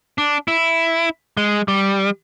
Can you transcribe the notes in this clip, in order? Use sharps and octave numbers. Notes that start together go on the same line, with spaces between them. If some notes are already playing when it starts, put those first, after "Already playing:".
D4
E4
G#3
G3